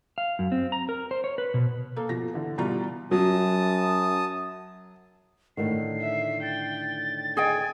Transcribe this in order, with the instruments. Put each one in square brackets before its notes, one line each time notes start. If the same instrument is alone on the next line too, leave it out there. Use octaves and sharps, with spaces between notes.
[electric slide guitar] F5
F#2
C4
A#5
A#4
C5
C#5
B4
B2
[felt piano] A#3 A4
B2 F3 A#6
D3 E3
B2 E3 G3 F4 D5 A#5
[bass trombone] F#2 [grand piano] F#3 [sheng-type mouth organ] A5 D#6
[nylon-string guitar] A2 D3 D#3 [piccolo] C7
[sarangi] E5
[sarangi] G5 [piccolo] A6
[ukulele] G#4 D#5 G5 [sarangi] G#5